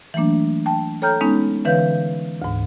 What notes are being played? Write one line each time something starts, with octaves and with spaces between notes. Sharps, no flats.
E3 F#3 A3 A#3 D4
G5 A5
A4 C#5 G5 A#5 F6 G6
G#3 B3 C#4 D#4
D3 E3 B4 C#5 F5 G6
D2 G#2